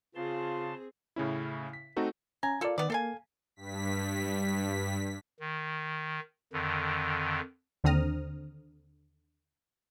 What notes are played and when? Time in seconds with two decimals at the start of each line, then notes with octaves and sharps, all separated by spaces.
0.15 C#3 C4 F4 G#4 A5 C6
1.16 A2 C#3 C#4 E4
1.73 B6
1.96 A3 C4 D#4 F#4 A4
2.43 C#4 G#5 A#5
2.61 A#3 F4 A4 D5
2.78 D#3 B3 D5
2.90 A#3 A4 F5 G#5
3.56 G2 B6
5.40 D#3
6.53 F2 D3 D#3
7.84 D#2 D3 C4 A#5 D#6 F6